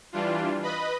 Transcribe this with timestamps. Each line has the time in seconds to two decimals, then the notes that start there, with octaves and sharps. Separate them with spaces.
0.13 E3 G3 D4 F4
0.63 B4 D#5 B5